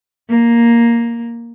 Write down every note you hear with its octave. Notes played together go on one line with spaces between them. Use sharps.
A#3